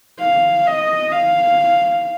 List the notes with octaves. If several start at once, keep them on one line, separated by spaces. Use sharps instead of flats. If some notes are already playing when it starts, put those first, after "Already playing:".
F5
D#5
F5